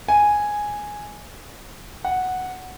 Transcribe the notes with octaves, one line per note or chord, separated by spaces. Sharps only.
G#5
F#5